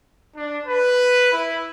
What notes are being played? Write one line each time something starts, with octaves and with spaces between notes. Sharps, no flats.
D4
B4
E4